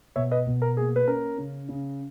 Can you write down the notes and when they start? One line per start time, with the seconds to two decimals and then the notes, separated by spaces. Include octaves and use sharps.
0.16 B2 C#5 E5
0.31 B4 D#5
0.47 B2
0.62 A#4
0.77 A#3 G#4
0.96 B4
1.07 C#4 A#4
1.38 C#3
1.69 C#3